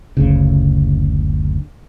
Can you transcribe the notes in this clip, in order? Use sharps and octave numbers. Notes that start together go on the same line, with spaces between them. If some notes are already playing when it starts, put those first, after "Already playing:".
F#1 D2 C#3